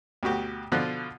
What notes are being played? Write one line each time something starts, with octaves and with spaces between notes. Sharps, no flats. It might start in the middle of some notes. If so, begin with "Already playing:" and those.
D2 B2 F#4 G4
B2 D3 F3 F4 F#6